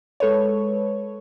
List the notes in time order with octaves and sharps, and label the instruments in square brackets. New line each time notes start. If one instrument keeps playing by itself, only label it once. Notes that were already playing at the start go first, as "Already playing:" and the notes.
[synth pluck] G#3 A4 B4 C#5